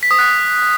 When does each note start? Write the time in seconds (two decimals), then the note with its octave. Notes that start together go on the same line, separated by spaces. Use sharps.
0.03 B6
0.11 D#6
0.19 F#6